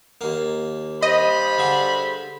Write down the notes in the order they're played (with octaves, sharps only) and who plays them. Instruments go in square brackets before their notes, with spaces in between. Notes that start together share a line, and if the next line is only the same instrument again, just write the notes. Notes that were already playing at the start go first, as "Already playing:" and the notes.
[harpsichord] D#2 A#3
[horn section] G2 C5 B5 [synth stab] D#5
[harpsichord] D3 G#4